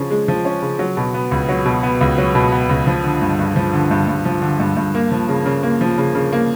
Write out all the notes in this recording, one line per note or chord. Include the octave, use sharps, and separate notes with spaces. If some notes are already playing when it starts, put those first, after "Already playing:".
Already playing: C#3 F3 C#4
G#3
F3
C#4
C#3
F#3
B2
B3
C#2
F#3
B2
B3
C#2
F#3
B2
B3
C#2
F3
D3
G2
G2
F3
D3
G2
G2
F3
D3
G2
G2
A#3
F3
C#3
C#3
A#3
F3
C#3
C#3
A#3